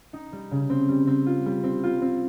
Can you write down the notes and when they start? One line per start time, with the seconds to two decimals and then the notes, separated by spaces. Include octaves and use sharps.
0.13 D#4
0.32 G3
0.51 C#3
0.70 C4
0.89 G3
1.07 C4
1.26 F4
1.46 G3
1.63 C4
1.83 F4
2.02 C4